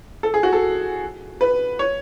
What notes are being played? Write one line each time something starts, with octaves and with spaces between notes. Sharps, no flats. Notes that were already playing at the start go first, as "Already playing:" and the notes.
A4
G#4
F#4
A4
B4
C#5